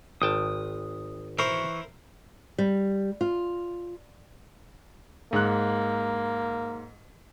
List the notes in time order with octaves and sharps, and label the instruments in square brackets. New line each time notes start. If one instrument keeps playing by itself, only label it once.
[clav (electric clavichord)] G#1 G5 A5 [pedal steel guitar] D#6
[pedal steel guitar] E3 C#6 [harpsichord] E4 A#4 C5
[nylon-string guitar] G3
F4
[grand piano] G#2 F#6 [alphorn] A#3